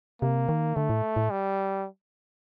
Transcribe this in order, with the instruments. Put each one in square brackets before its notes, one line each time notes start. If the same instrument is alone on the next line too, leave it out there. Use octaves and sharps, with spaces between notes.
[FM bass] C3 [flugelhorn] A#3
[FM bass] D#3
[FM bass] D3 [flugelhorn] A3
[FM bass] A2
A2
[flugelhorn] G3